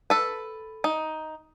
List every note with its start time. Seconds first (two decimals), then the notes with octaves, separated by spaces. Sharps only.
0.10 A4 B4
0.84 D#4